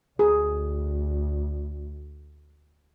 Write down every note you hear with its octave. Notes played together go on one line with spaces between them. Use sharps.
D2 G#4